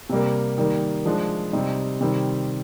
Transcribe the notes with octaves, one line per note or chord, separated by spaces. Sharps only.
C3 G3 A#3
D#3 G3 A#3
F3 G#3 D4
C3 G3 C4 D#4
C3 D#3 G3 C4